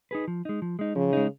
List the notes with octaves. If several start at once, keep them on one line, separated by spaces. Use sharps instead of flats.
D#4 G#4 B4
F3
G#3 D#4
F3
G#3 D#4
C#3 F3
G#3 D#4